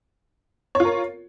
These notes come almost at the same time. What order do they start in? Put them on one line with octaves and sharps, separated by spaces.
C#5 F4 A#4